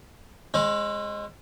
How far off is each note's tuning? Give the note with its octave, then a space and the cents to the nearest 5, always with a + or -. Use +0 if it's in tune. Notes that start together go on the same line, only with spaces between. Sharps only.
G#3 -10 C4 +45